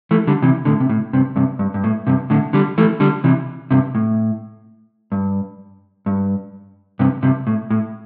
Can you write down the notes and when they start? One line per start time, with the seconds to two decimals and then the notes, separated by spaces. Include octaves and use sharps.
0.11 E3 A3
0.27 D3 G3
0.42 C3 E3
0.65 A2 D3
0.80 C3
0.89 A2
1.13 G2 C3
1.36 G2 C3
1.59 G2
1.74 G2
1.84 A2
2.07 G2 C3
2.30 A2 D3
2.53 D3 G3
2.78 E3 A3
3.00 D3 G3
3.24 C3 E3
3.71 G2 C3
3.95 A2
5.12 G2
6.06 G2
6.99 G2 C3
7.23 G2 C3
7.47 A2
7.70 A2